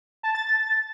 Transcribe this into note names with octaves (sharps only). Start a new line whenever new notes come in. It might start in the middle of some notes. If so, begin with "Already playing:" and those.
A5
A6
A6